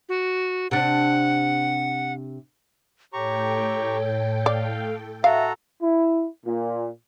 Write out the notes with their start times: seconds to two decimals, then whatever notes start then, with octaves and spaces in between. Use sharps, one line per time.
0.09 F#4
0.71 C3 D4 F#5
3.13 A2 G4 A4 C#5 G5 A#5 C#6
4.46 D5 F5
5.24 F#4 A4 E5 F5 A#5
5.82 E4
6.46 A#2